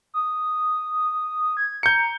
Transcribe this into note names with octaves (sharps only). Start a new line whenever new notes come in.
D#6
G#6
A#5 G6 C#7